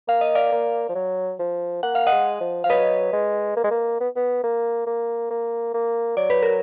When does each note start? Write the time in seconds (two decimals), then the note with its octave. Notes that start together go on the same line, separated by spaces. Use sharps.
0.08 A#3 F5
0.21 D#5
0.35 D5 F5
0.52 A#3
0.89 F3
0.95 F#3
1.39 F3
1.83 A#3 F#5
1.95 F5
2.07 D#5 F#5
2.12 G#3
2.41 F3
2.64 F3 F5
2.70 F#3 B4 D#5
3.13 G#3
3.57 A#3
3.64 G#3
3.71 A#3
4.01 B3
4.16 B3
4.43 A#3
4.87 A#3
5.31 A#3
5.74 A#3
6.17 F#3 D5
6.30 B4
6.43 A#4